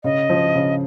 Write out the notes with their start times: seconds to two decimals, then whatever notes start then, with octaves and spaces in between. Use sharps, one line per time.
0.04 C#3 D#5
0.30 F3
0.55 C#3